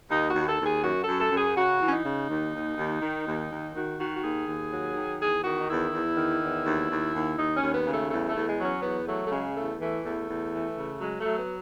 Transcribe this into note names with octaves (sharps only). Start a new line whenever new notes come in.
D#2 D#4
F#4
D#2
A4
D#2
G#4
F#2 F#4
A4
F#2
A4
F#2
G#4
C#3 F#4
E3
C#4
D#4
C#3
D#2
D#2
D#2
D#3
D#2
D#2
D#3 F#4
D#3 F#4
F#4
D#2 G#4
D#2
F#3
D#3
E2 G#4
D#3 F#4
D#4
E2 E4
E2
D#3
E2
D#2
D#2
D#2
D#2 D#4
C#4
D#2
B3
C#3
A3
E2 A3
A3
E2
G#3
F#3 C#4
E2 B3
F#3 A3
A3
C#3 G#3
E2 A3
E3 A3
E2 A3
E2
E3
C#3
F#3 G#3
A3
F#3
B3